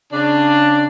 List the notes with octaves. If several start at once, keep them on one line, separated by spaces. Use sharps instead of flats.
C#3 D4